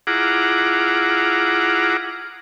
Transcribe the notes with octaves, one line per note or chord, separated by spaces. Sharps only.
E4 F4 G#4 F#5 A#5 D6